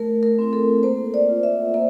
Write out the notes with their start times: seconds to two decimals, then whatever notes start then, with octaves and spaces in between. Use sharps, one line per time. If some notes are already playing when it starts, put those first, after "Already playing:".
Already playing: A3 A#4
0.23 A#4
0.39 C4 E4
0.53 A4
0.83 A#3 C5
1.14 D5
1.29 F4
1.43 E5
1.74 A#3 E5